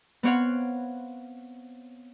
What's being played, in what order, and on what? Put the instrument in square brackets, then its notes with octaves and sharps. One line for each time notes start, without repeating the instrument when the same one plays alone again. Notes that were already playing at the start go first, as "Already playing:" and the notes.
[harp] B3 C4 C#5 F5 F#5